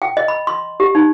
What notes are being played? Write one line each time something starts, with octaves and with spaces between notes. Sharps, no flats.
G5
D#5
B5
C6
G4
D#4